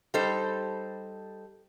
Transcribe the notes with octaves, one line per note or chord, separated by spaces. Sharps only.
G3 D#4 A4 C5